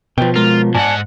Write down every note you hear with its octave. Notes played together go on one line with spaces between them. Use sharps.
B2 F3 B4 G5
G#3 F4 A#4
G#2 D5 F#5 G#5 A5